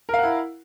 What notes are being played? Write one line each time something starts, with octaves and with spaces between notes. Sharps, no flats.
E4 A#4 F5 F#5